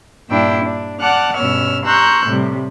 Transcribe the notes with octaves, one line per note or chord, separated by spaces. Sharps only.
G2 A#2 D4 E4 G5 E6
D4
D5 F#5 A5 D6 F6 F#6
G2 B2 C#4 C#5 E6 F6
A#5 C6 C#6 E6 F#6 G6
A2 C3 G3